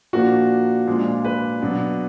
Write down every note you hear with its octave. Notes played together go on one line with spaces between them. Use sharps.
A#2 F3 A#3 D4 F#4
A#2 F3 G#3 D4
B4
B2 F#3 D4